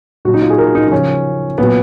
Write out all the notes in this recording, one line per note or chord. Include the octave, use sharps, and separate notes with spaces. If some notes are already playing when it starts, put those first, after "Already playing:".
A#2 F#3 F#4
D#4
F4
G#4
A#4
D#4
D#4
C#3 F3 C#4
A#2 F#3 B3